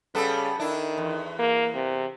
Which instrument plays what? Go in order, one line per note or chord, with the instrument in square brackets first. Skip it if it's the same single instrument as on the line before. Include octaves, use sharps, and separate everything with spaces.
[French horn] C#3 [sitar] G3 B3 A4
[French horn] D#3 [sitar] D4 E4
[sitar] E2
[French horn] A#3
C3